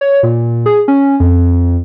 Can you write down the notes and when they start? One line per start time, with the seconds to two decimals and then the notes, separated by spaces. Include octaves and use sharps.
0.01 C#5
0.23 A#2
0.66 G#4
0.88 C#4
1.20 F2